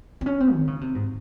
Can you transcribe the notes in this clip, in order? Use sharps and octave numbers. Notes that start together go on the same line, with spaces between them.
C4
C#4
C4
D#3
C#3
C3
G#2